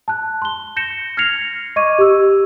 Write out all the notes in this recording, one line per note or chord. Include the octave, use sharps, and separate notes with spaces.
A5 F#6
C6 G7
G6 A#6 C#7 E7 G7
F6 G#6 A#6 C7 C#7 F7
D#5 C#6 D6 G#6 D#7
G4 E6